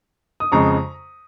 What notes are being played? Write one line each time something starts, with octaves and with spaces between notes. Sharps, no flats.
D#6
F2 C#3 G#3 A#5 C#6